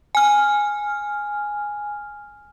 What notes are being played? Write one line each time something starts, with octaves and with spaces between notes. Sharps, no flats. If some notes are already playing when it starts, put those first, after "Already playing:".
G#5 F6